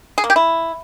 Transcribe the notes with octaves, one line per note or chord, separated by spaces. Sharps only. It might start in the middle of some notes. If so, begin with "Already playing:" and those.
G#4
A#3
G4
E4